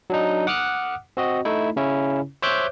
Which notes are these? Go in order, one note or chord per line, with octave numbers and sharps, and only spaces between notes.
F#3 D4 D#4
F#5 D6 D#6 F6 F#6
C4 F#4 D#5
A3 D#4 E4
C#3 C#4 E4
C5 C#5 E5 D6 F#6 G6